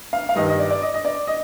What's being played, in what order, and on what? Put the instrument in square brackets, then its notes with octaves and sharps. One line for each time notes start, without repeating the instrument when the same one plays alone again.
[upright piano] F5
F5
G2 D#3 D#5
D#5
D5
D5
D#5
D#5
D5
D#5